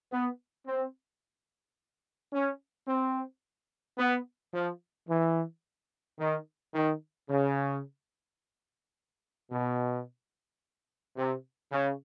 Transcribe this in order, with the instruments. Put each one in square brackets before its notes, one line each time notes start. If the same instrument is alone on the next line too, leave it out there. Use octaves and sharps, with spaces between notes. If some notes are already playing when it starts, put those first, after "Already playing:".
[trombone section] B3
C4
C#4
C4
B3
F3
E3
D#3
D#3
C#3
B2
C3
C#3